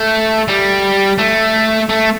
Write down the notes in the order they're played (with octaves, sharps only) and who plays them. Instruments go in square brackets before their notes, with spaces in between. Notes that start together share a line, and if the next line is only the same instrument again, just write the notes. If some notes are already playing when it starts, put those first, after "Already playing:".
Already playing: [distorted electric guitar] A3
G3
A3
A3